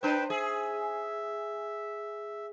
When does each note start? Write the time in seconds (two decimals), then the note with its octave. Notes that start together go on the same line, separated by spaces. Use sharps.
0.03 D4 B4 C5 G5
0.30 G#4 E5